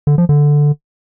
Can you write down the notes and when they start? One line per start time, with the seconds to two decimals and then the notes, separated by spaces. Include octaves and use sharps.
0.07 D3
0.18 F3
0.29 D3